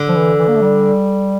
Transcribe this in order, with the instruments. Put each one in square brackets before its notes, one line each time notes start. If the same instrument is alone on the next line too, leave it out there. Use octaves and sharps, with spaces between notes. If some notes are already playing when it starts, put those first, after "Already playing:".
Already playing: [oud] D3
[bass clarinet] F3
E3
E3
A#3
A3
G3